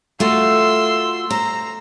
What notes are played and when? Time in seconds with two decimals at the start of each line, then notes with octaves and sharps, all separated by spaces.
0.20 A3 F4 F#4 C6 E6
1.30 C5 A#5